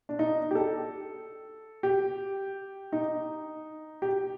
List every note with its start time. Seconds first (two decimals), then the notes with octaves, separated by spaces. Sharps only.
0.09 D4
0.19 D#4
0.51 G4
0.55 A4
1.83 G4
2.93 D#4
4.02 G4